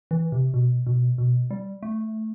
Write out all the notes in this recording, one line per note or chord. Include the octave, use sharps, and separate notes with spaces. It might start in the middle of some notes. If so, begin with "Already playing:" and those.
E3
C3
B2
B2
B2
G3
A3